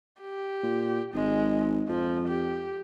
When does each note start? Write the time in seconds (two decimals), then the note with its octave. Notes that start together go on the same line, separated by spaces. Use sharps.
0.21 G4
0.63 A#2
1.14 G#1 G#3
1.89 F2 F3
2.28 G4